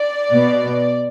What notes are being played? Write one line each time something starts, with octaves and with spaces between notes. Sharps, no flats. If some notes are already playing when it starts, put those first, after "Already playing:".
Already playing: D5
B2 B3